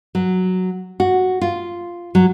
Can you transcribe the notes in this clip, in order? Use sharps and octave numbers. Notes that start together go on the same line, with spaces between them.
F#3
F#4
F4
F#3